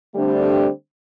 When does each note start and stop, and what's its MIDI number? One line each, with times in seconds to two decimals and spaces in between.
0.15 0.68 50
0.15 0.68 55
0.15 0.68 57
0.15 0.68 60
0.15 0.68 62
0.15 0.68 67